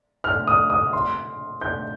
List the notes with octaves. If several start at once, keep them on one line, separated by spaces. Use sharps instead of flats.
F6
D#6
D#6
C6
G6